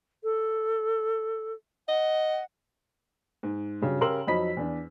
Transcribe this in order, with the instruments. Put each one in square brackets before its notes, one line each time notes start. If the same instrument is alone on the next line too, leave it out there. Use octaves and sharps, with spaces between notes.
[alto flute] A4
[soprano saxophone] D#5 [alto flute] F#5
[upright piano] G#2
G2 C#3 F#3 G3
C#3 G4 A#4 C6 E6 F#7
F2 F#3 D#4 D#5 B5 B6
E2 D4